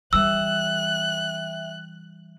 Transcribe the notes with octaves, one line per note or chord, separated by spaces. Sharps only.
E3 G3 E5 G5 E6 F#6